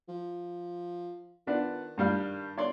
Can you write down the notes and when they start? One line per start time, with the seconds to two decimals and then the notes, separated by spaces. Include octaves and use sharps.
0.09 F3
1.47 D#3 B3 D4 F4
1.98 G2 G3 F5
2.58 G1 C#5 D5 C6